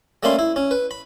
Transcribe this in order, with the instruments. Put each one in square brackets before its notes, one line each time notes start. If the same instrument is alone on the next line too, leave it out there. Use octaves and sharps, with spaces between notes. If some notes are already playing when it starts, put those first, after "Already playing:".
[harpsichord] G3 A3 A#3 C#4 B5 C6
E4
C#4
B4
B5